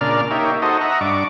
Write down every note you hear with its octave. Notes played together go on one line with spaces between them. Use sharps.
A#2 C#3 D4 A#4 D5 F6
A#3 D#4 G4 C#5 E5
D#4 F#4 A4 C5 D#5
D#5 E5 F#5 A#5
G2 D4 C#6 D6